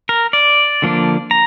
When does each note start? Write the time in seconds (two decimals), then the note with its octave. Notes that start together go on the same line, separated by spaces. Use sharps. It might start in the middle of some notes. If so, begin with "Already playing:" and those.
0.09 A#4
0.33 D5
0.82 D3 F3 A#3 D4
1.31 A#5